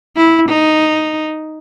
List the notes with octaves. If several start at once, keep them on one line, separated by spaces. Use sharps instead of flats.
E4
D#4